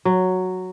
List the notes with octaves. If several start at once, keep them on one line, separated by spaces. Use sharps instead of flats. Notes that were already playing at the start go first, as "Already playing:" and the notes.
F#3